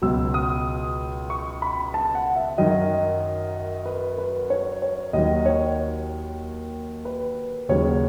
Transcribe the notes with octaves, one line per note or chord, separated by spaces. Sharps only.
C#2 B2 F#3 E6
D#6
C#6
B5
A5
F#5
E5
F#2 D#3 F#3 D#5
B4
B4
C#5
C#5
D#2 D#3 F#3 D#5
C#5
B4
D#2 C#3 F#3 C#5